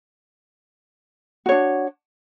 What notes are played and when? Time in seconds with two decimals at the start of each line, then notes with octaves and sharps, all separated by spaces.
1.46 F#4
1.49 C#5
1.52 D4